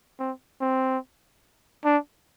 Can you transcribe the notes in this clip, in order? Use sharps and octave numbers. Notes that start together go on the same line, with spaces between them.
C4
C4
D4